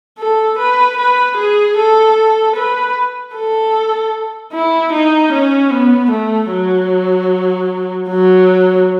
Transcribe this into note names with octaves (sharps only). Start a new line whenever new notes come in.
A4
B4
B4
G#4
A4
B4
A4
E4
D#4
C#4
B3
A3
F#3
F#3